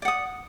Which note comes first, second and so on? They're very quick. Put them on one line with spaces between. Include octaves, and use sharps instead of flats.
D5 F#5 D#6